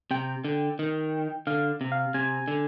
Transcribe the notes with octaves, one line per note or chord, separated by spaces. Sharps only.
C3 G5
D3
D#3
D3 F5
C3
F5
C3 G#5
D3